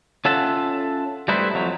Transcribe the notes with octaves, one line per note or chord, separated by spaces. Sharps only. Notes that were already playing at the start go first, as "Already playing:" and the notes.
C#4 F4 A4 E5 F#5 A5
G3 A3 D#4 E4 B4 C5
F2 F#3